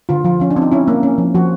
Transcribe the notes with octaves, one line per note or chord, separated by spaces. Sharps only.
D3 F4
F3 F4
F3 C#4
D4
C4
D#4
C#4 E4
A#3
C#4
F3
F3 F#4